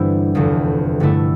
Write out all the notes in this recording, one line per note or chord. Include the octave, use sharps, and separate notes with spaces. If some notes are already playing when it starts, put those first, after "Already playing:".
Already playing: G1 G2 E3 G3 C4 E4
F1 E2 D3
G2 D3 A3 E4